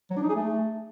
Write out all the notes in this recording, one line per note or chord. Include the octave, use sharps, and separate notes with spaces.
F#3
D4
D#4
G#4
A3